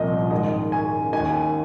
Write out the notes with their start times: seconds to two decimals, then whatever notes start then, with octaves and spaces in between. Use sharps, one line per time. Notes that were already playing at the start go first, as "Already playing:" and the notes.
Already playing: C2 A#2 F3 D#5
0.31 G#2 D#3 D#5
0.72 G#5
1.13 D#2 D#3 G#5